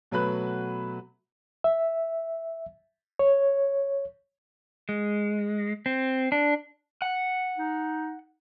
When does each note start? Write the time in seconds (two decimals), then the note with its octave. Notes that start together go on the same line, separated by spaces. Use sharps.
0.11 B2 F#3 A3 B4 B5 F#6
1.64 E5
3.19 C#5
4.89 G#3
5.86 C4
6.32 D4
7.02 F#5
7.58 D#4